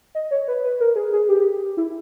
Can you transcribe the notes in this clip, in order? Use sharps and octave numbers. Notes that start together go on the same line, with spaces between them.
D#5
C#5
B4
B4
A#4
G#4
G#4
G4
E4